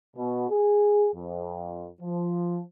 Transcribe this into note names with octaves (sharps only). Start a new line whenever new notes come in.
B2
G#4
F2
F3